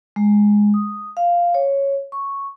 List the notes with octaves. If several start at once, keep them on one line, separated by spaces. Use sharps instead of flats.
G#3
D#6
F5
C#5
C#6